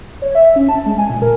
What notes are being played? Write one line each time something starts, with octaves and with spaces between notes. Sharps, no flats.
C#5
E5
C#4
A5
G#3
G#5
A#2
A#4